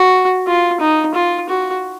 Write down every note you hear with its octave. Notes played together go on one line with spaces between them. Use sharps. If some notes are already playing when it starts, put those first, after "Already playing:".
Already playing: F#4
F4
D#4
F4
F#4